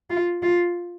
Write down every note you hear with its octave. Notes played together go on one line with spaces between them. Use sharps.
F4
F4